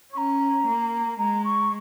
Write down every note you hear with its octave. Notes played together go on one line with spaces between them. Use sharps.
C#4 C#6
A#5
A#3
G#3 A#5
C#6